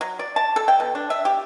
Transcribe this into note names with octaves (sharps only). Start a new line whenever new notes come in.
F#3
D5
A5
A4
G5
B2
D4
E5
G4